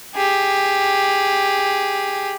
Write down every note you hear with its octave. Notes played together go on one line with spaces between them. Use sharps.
G4 G#4